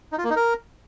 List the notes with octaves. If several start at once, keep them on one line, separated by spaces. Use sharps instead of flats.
D#4
F4
A#3
D#4
A#4